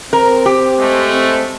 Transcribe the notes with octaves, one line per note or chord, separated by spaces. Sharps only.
C4 A#4
G4
G#3 A3
C4